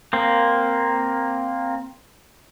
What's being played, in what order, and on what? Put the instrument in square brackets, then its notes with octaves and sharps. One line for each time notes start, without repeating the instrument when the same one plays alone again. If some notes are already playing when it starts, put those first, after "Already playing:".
[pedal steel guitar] A#3 C4